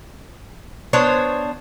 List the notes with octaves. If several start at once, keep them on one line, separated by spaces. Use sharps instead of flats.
B3 D4 C5 C#5